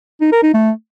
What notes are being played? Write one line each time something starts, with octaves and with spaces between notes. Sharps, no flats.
D#4
A#4
D#4
A3